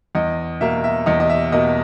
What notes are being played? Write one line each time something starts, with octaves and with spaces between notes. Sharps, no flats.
E2 D#5
B2 A#3 E5
E5
E2 D#5
D#5
E5
B2 A#3 D#5